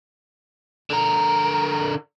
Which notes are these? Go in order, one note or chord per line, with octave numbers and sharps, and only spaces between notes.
D3 A#4